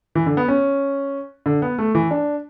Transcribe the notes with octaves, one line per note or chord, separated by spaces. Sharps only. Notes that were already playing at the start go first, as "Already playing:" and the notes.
E3
D3
B3
C#4
D3
B3
A3
E3
D4